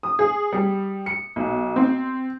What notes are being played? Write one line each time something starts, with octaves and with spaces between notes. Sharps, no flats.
D#6
G#4
G3
C#7
B1
C4